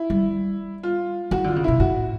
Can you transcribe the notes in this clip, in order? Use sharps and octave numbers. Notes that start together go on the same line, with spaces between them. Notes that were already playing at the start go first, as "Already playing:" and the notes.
Already playing: E4
G3
F4
E3 F#4
D3 F4
C#3
B2 E4
A2 F#4